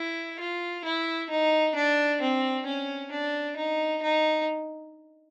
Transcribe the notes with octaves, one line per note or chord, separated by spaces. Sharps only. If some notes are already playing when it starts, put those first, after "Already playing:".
Already playing: E4
F4
E4
D#4
D4
C4
C#4
D4
D#4
D#4